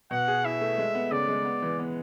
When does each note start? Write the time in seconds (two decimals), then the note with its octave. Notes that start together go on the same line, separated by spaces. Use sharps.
0.11 B2 F#5
0.28 G#4
0.45 E4 E5
0.61 A3
0.78 G#3
0.95 B3
1.12 C#3 D5
1.28 G#3
1.45 B3
1.62 E3
1.79 B3